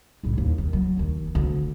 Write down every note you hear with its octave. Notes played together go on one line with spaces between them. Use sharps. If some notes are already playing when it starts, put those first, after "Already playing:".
C#2 A2
D#2
D#3
F#3
D#2 D#3
D2